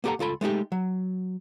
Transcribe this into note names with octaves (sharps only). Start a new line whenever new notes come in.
A#3 B3 G4 A4 F#5 A#5
C#2 F4 A4 B5
G#3 A3 D#4 G4
F#3